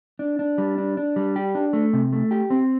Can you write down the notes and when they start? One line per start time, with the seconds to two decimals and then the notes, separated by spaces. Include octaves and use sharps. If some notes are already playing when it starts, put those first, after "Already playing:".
0.19 D4
0.39 D4
0.58 G3
0.78 D4
0.97 D4
1.16 G3
1.36 G4
1.55 D4
1.73 A3
1.93 C3
2.13 A3
2.31 G4
2.50 C4